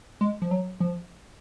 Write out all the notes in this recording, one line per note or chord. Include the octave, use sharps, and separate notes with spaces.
G#3
F3
F#3
F3